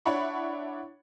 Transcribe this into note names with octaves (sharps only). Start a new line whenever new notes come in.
D4 E4 C#5 F#5 B5 C#6